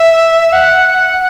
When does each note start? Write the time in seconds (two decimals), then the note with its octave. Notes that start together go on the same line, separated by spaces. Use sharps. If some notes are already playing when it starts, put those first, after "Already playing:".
Already playing: E5
0.52 F#5